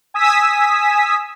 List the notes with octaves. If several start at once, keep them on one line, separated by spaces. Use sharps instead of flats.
G#5 D#6 E6 B6